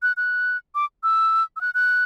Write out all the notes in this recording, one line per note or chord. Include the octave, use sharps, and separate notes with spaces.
F#6
F#6
D6
E6
E6
F#6
F#6